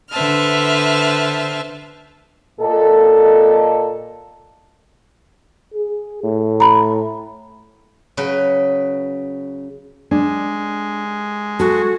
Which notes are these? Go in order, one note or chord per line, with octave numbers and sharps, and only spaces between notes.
D3 B4 C5 E5 A5 F6
A#2 A4 D#5
G#4
A2
A#5 B5
C#3 F#3 B4
G#3 D4
F#4 A4